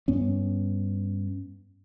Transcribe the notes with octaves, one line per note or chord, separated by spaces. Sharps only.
G2 B3 C#4